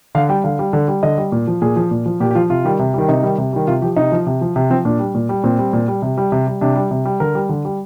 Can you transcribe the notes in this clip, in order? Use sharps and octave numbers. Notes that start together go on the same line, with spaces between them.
D3 F5
G3 G5
D3 F5
G3
D3
G3
D3 D#5
G3
A#2
F3
A#2 G#4
F3
A#2
F3
A#2 G4
G4
F3 F4
C3 F4
D#3 G3
C3
D#3 G3
C3 D#4
D#3 G3
C3
D#3 G3
C3 F4
F3 G4
C3 D#4
F3
C3
F3
C3
F3 C4
A#2 D4
G3
A#2
G3
A#2 C4
G3
A#2
G3
C3
G3
C3
G3
C3 D4
G3
C3
G3
D3 A#4
G3
D3
G3